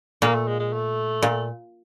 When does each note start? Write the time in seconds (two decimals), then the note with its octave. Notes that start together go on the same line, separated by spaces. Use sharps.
0.22 A#2 A#3
0.35 A3
0.48 G#3
0.59 G#3
0.73 A3
1.22 A#2